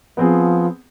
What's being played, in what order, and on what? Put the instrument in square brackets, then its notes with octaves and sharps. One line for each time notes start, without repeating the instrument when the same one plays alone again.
[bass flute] F3 [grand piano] B3 C4 G#4